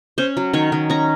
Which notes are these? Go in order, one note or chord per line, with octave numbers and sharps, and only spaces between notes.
C#4 C5
F#3
D#3 C#5
D#3
C#4 A#5